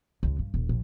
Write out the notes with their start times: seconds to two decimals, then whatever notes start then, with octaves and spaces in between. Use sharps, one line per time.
0.23 C#2
0.39 G2
0.54 D#1
0.69 A#1